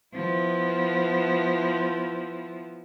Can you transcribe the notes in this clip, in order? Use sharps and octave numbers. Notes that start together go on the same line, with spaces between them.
F3 B3 E4